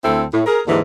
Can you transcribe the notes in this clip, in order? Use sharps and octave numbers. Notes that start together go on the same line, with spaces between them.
D2 C4 E4 A4
A2
G#4 A#4
D#2 G#2 D3 E3